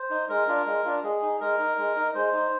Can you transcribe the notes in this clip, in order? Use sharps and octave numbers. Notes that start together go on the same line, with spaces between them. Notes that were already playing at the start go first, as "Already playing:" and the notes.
Already playing: C5
D#4
G#3 A#4
D4 F4
G#3
D4 F4
G#3 G#4
D#4
G#3 A#4
D#4
G#3
D#4
G#3 C5
D#4